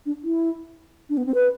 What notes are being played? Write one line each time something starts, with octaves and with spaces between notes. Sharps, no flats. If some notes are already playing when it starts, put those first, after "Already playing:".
D4
E4
D4
B3
C4
B4